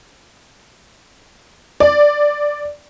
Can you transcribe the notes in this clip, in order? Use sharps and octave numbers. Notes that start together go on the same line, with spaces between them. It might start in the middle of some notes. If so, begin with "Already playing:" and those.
D5